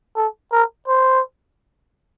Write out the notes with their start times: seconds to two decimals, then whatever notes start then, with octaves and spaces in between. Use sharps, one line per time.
0.16 A4
0.52 A#4
0.88 C5